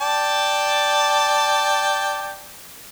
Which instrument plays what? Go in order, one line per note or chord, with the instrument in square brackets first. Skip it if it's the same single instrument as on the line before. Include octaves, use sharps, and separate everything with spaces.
[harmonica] D5 G5 A5